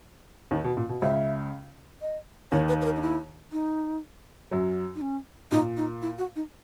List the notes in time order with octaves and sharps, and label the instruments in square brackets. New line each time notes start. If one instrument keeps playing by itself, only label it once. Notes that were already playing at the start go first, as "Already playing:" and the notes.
[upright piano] D#2 D#3
B2
A#2
B2
[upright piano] C#2 C#3 [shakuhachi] E5
[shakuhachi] D#5
[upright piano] D#2 D#3 [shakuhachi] C#5
[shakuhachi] B4
B4
A#4
D#4
E4
D#4
[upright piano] F#2 F#3
[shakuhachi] D#4
C#4
[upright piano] A#2 [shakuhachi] D#4
[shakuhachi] D#4
E4
F#4
D#4